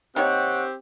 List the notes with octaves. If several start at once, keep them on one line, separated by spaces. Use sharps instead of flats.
D#3 A#3 C4 G4 C#5 F#5